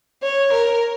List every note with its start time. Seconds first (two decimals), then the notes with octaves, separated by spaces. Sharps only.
0.24 C#5
0.53 A#4